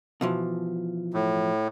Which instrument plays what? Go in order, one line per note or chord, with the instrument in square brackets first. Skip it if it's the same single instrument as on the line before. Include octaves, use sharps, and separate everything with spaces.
[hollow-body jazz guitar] B2 E3 F3
[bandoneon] A2